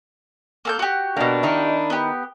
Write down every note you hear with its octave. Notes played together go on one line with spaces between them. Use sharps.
A#3 A4 G6
F#4 G4
B2 A#3 D4
D#3 D#4 E4
B3 G4